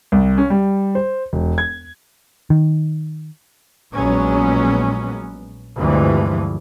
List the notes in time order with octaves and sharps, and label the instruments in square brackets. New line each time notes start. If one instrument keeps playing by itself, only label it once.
[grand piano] C2
C#4
G3
C5
E1
G#6
[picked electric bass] D#3
[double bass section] A#1 A#2 F#3 G#3 B3 C#4
D2 G2 C3 E3 F3 G#3